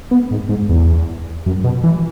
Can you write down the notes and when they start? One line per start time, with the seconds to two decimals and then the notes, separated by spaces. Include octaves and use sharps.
0.11 B3
0.31 G#2
0.49 G#2
0.69 E2
1.46 F#2
1.64 B2
1.83 E3